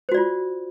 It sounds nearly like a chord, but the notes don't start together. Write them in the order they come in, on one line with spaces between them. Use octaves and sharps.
C5 F#4 D5 F4